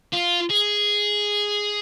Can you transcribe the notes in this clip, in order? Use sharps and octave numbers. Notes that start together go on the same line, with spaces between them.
F4
G#4